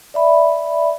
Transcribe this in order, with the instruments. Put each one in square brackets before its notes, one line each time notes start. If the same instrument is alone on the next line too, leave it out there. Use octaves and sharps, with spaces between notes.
[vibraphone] D5 E5 B5